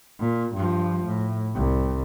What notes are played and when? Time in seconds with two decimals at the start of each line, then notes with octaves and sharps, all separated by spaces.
0.19 A#2
0.54 G2 F3
1.05 A2
1.55 C2